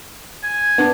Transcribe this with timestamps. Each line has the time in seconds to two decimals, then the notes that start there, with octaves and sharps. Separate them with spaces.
0.44 G#5
0.78 B3 D4